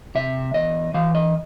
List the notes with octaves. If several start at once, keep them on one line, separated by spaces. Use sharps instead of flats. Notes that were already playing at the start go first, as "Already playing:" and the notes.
C3 E5
E2 D#5
E3 F5
D#5